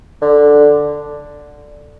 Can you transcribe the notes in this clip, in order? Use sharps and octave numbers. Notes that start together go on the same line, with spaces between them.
D3